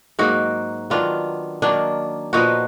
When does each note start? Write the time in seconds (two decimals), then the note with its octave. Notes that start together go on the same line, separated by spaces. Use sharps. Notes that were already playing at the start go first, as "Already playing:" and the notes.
0.19 G#2 F#3 A#3 D#4 F#4
0.90 D#3 F#3 B3 D4 F4
1.62 D#3 F#3 A#3 D4
2.33 A#2 F3 B3 D#4 F#4